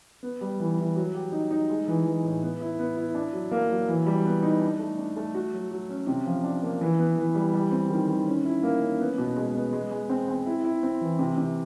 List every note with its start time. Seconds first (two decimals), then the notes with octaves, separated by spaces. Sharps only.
0.23 B3
0.41 G3
0.60 E3
0.78 E3
0.96 F#3
1.15 G4
1.32 D#4
1.51 D#4
1.70 G#3
1.88 E3
2.05 E3
2.24 A2
2.43 B3
2.61 E4
2.79 B3
2.97 E4
3.15 D4
3.33 F#3
3.51 A#3
3.70 F#3
3.88 E3
4.06 G3
4.25 B3
4.43 D#4
4.61 D4
4.79 A3
4.98 D4
5.17 A3
5.34 F#4
5.53 F#3
5.71 F#3
5.89 C#4
6.07 C3
6.26 F3
6.44 D4
6.62 A#3
6.81 E3
6.99 B3
7.17 E3
7.35 G3
7.53 G3
7.72 C4
7.90 D#3
8.09 D#3
8.27 C#4
8.45 E4
8.63 A#3
8.81 C#4
9.00 B3
9.18 B2
9.36 G#3
9.55 B3
9.73 G#3
9.91 G#3
10.09 C4
10.28 C4
10.46 E4
10.64 E4
10.83 C4
11.01 E3
11.19 C3
11.38 C3